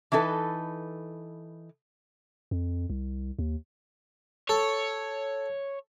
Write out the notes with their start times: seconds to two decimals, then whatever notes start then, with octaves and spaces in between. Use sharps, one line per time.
0.12 E3 D4 D#4 A4 B4
2.51 F2
2.90 C2
3.39 D#2
4.49 A4 C#5